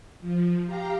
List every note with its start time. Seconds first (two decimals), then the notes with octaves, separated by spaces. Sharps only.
0.21 F3
0.65 G4 F5 A#5